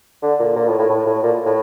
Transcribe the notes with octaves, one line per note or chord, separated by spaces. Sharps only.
D3
A#2
A#2
A2
A2
A2
A2
A#2
A2